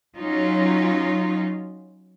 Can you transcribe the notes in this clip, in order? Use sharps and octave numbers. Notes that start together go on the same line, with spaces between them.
F#3 C#4 D#4 F4